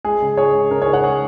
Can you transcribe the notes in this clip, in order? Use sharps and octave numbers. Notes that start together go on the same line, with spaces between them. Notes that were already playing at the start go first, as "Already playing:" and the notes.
G#3 G#4
C#3
G#3 G#4 C#5
C#3
C#3 A#4
G#4 C#5
D#4
C#5 F#5
G#3 G#4 C#5